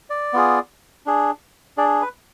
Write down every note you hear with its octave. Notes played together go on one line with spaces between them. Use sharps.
D5
B3 F4 G#4
D4 G#4
D4 G#4 D5
B4